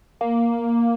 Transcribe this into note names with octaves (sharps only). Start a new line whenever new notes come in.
A#3